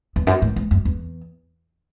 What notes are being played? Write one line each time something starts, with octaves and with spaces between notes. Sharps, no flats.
E2
F#2
A2
G#2
F#2
E2